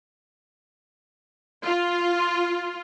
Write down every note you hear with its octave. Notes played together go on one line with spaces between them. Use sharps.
F4